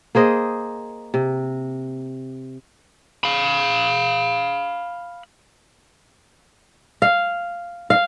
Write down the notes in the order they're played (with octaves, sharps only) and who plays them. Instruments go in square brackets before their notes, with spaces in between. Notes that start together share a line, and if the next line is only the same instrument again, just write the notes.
[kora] A#3 G#4 C5 D#5
C3
[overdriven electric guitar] F5 B5
[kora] F5
F5